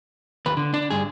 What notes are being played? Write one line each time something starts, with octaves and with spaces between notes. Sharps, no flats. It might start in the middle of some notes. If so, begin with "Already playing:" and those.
D#2 B4
D3
D4
G2 G#4